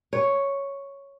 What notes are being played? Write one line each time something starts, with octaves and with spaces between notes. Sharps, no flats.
C#5